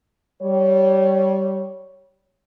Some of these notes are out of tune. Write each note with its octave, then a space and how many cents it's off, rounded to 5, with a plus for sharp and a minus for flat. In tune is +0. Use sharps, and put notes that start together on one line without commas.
G3 -20 C#5 +0